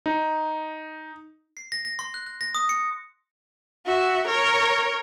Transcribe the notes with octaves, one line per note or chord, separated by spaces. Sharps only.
D#4
C7
A#6
A#6
C6
F#6
F#6
A#6
D#6
C#7
F#4 E5
A#4 C#5